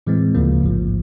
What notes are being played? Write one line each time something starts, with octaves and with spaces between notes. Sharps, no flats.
A2 E3 G#3 C4
D2 C#3 F3 A#3
A1 G#2 F3